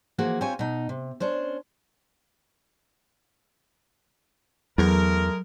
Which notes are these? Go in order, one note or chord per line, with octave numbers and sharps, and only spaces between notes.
E3 F3 A#3 F#4 G#4
C4 F4 G4 C#5 G#5
B2 D#4
C3
C#4 D4 C5
E2 F#3 G#3 A3 A#4